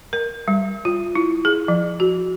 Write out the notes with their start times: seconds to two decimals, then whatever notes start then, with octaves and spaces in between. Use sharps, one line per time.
0.13 A#4
0.48 G3
0.85 F4
1.15 E4
1.45 G#4
1.68 F3
2.00 F#4